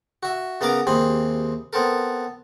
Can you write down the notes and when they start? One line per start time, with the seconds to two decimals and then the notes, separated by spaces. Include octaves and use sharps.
0.23 F#4 E5
0.61 C#3 B3 A#4 A#5 D6
0.87 D#2 C3 C4 G#4 B5
1.73 B3 C4 A4 A#4